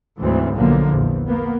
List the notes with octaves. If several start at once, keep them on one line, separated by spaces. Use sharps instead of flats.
D2 G#2 E3 F#3 C4
B1 D3 F3 A#3
A#1 E2
A#3 B3